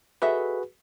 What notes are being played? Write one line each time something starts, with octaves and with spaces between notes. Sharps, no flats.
F#4 G#4 A4 B4 D#5 E5